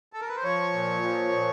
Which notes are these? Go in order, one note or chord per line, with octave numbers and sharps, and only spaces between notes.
A4
A#4
B4
C5
F3 C#5
A#2
F3
A#2